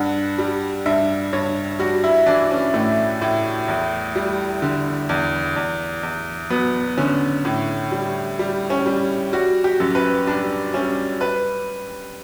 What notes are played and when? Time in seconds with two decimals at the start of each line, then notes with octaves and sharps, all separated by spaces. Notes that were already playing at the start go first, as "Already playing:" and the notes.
Already playing: G2 F#5
0.38 G3
0.86 G2 E5
1.33 G2 C#5
1.79 G3 F#4
2.04 E4
2.27 E3 D4
2.51 C#4
2.74 A2 A3
3.22 A2
3.68 E2
4.16 G3
4.62 D3
5.09 E2
5.56 E2
6.03 E2
6.50 F#3 B3
6.98 D3 C#4
7.45 A2
7.92 G3
8.39 G3
8.70 C#4
8.86 G3
9.33 G3 F#4
9.64 G4
9.80 F#2
9.95 B4
10.27 G3 D4
10.74 G3 C#4
11.21 B4